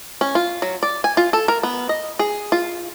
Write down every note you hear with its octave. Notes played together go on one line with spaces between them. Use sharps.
C#4
F4
F#3
D5
G#5
F4
A4
A#4
B3
D#5
G#4
F4